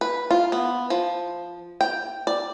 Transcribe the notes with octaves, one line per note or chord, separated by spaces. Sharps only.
B4
F4
B3
F3
G5
D5